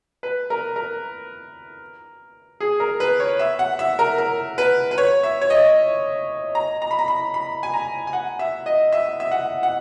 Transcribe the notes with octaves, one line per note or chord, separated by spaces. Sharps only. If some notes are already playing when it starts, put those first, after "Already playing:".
B4
A#4
A#4
G#4
A#4
B4
C#5
E5
F#5
E5
A#4
A#4
B4
B4
C#5
E5
C#5
D#5
A#5
A#5
B5
A#5
B5
B5
G#5
A#5
G#5
F#5
E5
D#5
E5
E5
F#5
F#5